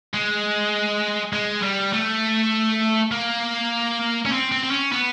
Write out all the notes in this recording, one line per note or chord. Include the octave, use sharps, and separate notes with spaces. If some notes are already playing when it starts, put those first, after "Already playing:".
G#3
G#3
G3
A3
A#3
C#4
C4
C4
C4
C#4
B3